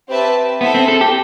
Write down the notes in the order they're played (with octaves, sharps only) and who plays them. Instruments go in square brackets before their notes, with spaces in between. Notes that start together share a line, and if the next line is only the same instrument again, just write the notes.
[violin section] C4 G4 B4 E5 A5
[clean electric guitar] B3 [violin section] E4 A4 C5 E5
[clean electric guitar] C4
A4
G4